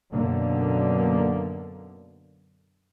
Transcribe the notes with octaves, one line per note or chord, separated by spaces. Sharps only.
F#2 B2 D3 A#3